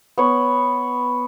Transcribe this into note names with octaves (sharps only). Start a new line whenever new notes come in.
B3 C#5